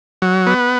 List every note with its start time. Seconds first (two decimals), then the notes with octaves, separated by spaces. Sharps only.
0.22 F#3
0.47 B3